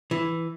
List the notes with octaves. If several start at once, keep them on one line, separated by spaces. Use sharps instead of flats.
E3